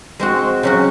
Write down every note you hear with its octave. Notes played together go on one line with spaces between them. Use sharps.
G#3 C4 F#4
C#3 F#3 C#4 F#4